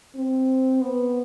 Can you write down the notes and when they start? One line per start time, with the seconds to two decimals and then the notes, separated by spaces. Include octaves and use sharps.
0.15 C4
0.82 B3